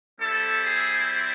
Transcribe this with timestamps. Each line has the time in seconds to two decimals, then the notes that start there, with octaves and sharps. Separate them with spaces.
0.19 G3 C4 E4 A4
0.64 G#4